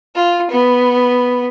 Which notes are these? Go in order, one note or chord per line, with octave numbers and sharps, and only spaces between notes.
F4
B3